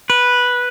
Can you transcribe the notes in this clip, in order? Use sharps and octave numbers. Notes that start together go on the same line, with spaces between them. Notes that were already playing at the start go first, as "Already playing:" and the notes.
B4